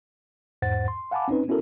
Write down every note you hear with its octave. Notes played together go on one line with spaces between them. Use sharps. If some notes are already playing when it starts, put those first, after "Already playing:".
E2 G#2 C5 F#5 A6
C6
F5 F#5 G#5 A5 B5 D6
C4 C#4 D#4 B4
B3 C#4 E4 F#4 A4 A#4